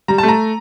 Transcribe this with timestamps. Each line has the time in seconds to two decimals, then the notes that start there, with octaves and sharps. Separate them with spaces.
0.08 G3 A#5
0.18 A3 A5
0.28 A#5